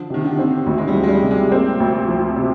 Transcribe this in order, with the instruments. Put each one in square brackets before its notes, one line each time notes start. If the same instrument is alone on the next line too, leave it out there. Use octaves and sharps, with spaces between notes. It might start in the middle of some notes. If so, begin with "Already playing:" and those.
Already playing: [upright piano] D3 [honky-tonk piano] F3
[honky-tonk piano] C3 [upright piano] D#3
[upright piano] D3
[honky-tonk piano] C4
[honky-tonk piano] D2 [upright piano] D#3
[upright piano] G#3
G3
[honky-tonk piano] F3
[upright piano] G#3
G3
[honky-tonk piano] C3
[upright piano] G#3
[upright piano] A#3 [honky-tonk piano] C4
[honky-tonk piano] D2
F3
C3